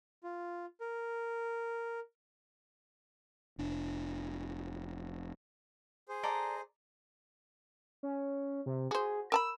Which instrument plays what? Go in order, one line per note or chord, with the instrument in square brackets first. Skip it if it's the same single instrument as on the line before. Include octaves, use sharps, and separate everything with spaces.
[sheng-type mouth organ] F4
A#4
[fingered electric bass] F1 D4
[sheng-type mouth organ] G#4 C5
[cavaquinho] A4 D5 A#5
[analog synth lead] C#4
C3
[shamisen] F#4 C5 [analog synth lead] G#4
[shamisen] A#4 A5 B5 [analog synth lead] E6